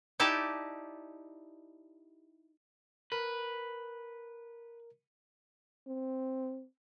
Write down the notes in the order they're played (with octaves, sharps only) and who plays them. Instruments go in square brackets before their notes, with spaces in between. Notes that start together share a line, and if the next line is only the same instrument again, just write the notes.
[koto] D#4 E4 G4 D5 A5
[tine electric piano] A#4 [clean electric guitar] B4
[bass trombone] C4